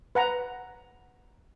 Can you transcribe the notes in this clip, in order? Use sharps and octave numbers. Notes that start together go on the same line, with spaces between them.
B4 F#5 A#5